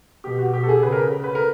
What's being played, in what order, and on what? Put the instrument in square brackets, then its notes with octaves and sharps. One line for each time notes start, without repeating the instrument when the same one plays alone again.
[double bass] B2 [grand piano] G4
[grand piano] F#4
[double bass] B2 [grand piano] G4
[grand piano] A4
G#4
[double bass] C#3 [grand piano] B4
[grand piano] A#4
B4
A#4